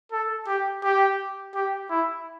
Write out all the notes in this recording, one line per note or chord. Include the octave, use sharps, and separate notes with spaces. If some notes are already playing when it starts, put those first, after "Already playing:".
A4
G4
G4
G4
E4